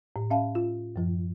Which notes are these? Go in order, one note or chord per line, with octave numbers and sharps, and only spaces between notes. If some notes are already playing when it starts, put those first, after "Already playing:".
A2
C#4 E5 F5 A5
F4
F#2 F3